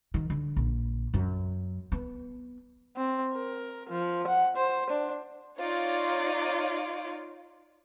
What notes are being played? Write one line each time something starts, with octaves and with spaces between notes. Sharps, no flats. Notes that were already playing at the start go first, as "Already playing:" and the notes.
D#3
D3
A#1
F#2
B3
C4
A#4
F3
F#5
C5
D4
D#4 F4 C#5 D5